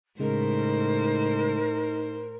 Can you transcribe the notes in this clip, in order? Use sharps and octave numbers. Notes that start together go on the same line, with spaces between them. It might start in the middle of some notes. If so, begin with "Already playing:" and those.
A2 C#3 G#3 D#4 A#4 C5